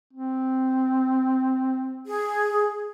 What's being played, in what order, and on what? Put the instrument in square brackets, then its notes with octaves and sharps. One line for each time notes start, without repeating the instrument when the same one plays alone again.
[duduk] C4
[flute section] G#4